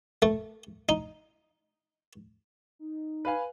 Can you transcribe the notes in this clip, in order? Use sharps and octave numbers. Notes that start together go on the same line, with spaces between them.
A3
D#4
D#4
B4 F5 G#5